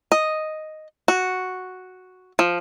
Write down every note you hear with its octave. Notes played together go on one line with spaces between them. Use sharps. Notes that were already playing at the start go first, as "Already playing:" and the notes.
D#5
F#4
F3